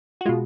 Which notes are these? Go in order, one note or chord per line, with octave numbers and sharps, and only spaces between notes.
F#4
B2 G#3 F4